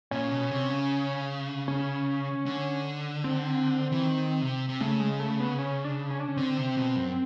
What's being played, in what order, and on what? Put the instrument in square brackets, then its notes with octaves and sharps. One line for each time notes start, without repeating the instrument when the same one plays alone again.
[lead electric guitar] A#2 [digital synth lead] C#4
[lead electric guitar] B2
C3
C#3
[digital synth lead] C#4
[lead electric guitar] D3
[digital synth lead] C4
[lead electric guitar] E3
D#3
C3
C3
[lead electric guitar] C#3 [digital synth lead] A3
[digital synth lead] G#3
A3
B3
C#4
D4
C#4
D4
C#4
[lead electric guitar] D3 [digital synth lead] C4
[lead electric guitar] C3
B2
F#2